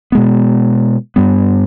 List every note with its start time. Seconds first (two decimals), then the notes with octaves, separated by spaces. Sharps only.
0.12 B2 G#3 B3
1.16 G2 G3 B3